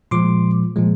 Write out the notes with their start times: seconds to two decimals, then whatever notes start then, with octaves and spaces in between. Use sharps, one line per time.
0.11 A#2 F3 G#3 C6 D6
0.76 A#2 F3 G#3